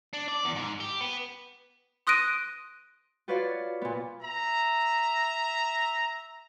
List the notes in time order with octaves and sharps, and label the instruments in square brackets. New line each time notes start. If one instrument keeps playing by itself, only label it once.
[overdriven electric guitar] D4
D5
E2
G#2
G4
B3
[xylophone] C6 D#6 F#6 A#6 D7 D#7
[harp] F4 F#4 B4 C#5 D5 F5
A#2 B3
[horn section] E5 A#5